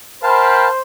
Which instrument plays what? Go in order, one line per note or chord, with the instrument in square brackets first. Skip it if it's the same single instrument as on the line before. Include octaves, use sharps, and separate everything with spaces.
[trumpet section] A#4 G5 B5 [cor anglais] C5 [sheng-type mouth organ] F5 A5